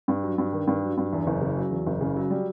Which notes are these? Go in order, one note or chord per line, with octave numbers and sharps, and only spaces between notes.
G2
F#3
G2
D#3
G2
F#3
G2
E2
F#1
C#3
F#3
E2
F#1
C#3
F#3
G3